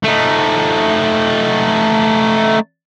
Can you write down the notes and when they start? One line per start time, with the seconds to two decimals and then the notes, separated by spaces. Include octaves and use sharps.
0.04 A3 D#4